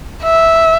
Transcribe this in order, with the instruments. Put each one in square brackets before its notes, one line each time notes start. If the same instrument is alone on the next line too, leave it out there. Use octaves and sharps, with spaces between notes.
[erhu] E5